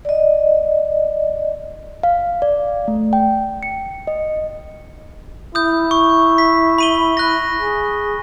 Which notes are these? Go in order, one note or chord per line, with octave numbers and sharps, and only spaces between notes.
D5 D#5
F5
D5
A3
G5
C#7
D#5
E4 D#6 G6
C#6
B6
B5 D#7 G7
F#6 A#6
G#4